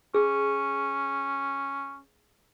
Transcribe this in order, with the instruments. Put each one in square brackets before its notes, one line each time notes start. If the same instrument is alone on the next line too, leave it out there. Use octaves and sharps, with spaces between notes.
[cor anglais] C#4 [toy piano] G#4